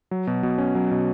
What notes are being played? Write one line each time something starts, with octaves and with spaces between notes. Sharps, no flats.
F#3
B2
B2
C#4
F#3
B2